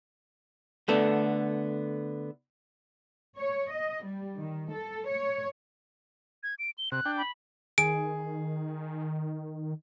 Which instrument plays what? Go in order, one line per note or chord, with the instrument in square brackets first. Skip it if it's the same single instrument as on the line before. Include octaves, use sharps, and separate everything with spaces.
[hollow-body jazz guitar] D3 A3 B3
[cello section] C#5
D#5
G3
D#3
A4
C#5
[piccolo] G#6
D7
G7
[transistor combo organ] C3 [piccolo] F#6
[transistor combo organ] D4 G5
[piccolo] B5
[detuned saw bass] D#3 [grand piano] G#4 [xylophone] D7